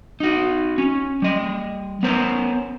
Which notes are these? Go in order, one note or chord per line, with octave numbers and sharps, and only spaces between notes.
D#4 F#4
C#4
G3 D#5
B3 C#4 A#4 C5